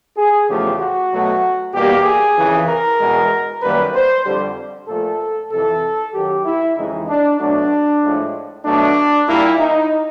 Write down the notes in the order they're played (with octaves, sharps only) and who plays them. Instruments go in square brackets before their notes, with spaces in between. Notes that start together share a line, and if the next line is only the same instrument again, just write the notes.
[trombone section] G#4
E2 C#3 F3 A3 G4
F#4
B2 F#3 A3
E2 B2 G3 A#3 G4
G#4
F2 C#3 E3
A#4
E2 B2 G#3
F#2 D#3 G3 A#3 B4
C5
F2 D3 G3
A#2 F3 A3 A4
F2 C3 E3 A4
F#2 D#3 F#3 G4
E4
F2 C#3 E3 G#3 D#4
D4
B2 F#3 A3 D4
A2 F3 G#3
B2 F#3 A3 D4
A#2 G3 A#3 E4
D#4